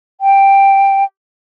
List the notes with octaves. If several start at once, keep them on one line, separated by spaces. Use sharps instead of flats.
G5